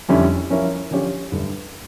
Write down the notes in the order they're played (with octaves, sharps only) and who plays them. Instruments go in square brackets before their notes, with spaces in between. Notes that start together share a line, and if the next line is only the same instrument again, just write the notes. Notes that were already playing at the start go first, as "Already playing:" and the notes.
[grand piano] F2 D3 G3 C#4 E4
F3 C#4 E4 A#4 C#5
D3 F3 C#4 G4 C#5
G2 D3 A3